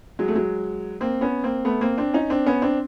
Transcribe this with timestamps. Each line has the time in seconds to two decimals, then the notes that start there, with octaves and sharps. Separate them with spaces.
0.19 F#3 G#3
0.28 A3
0.35 F#3 G#3
1.01 A#3 C4
1.21 B3 C#4
1.43 A#3 C4
1.65 A3 B3
1.81 A#3 C4
1.98 C4 D4
2.14 C#4 D#4
2.30 C4 D4
2.47 B3 C#4
2.62 C4 D4